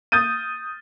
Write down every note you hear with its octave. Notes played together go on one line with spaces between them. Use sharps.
D#6 G6 A6 D#7